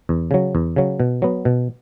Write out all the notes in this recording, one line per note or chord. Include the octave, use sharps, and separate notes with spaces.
E2
C#3 F#3
E2
C#3 F#3
B2
F#3 B3
B2